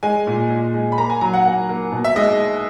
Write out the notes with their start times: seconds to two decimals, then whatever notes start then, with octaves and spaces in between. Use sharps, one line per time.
0.03 G#3 G#5
0.27 A#2
0.50 A#2
0.74 G#3
0.92 B5
0.98 A#3 A#5
1.10 G#5
1.21 F#3 A#5
1.34 F#5
1.45 A#3 F#5
1.69 A#3
1.92 B2
2.04 E5
2.16 G#3 D#5